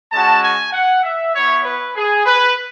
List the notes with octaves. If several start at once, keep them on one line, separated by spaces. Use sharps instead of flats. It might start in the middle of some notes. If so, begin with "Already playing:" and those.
G#3 C#4 F#4 A5
G#5
F#5
E5
B3 E4 C#5
B4
G#4
B4